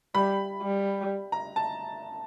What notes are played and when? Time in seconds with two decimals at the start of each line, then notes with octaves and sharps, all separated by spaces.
0.15 G3 B5
0.62 G3
1.32 A#5
1.56 A5